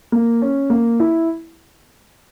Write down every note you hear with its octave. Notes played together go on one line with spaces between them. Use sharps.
A#3
C#4
A#3
E4